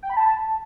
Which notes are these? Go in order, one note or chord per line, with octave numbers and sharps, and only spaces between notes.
G5
B5
A5